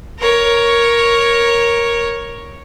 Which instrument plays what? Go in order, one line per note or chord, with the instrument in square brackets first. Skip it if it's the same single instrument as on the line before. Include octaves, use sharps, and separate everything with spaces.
[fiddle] A#4 C#5